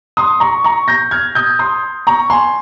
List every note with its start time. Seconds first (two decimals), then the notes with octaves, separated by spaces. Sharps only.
0.17 C6 D#6
0.40 A#5 C#6
0.64 A#5 C#6
0.88 G6 A#6
1.11 F6 G#6
1.35 D#6 G6
1.59 C6 D#6
2.07 A#5 C#6
2.30 G#5 C6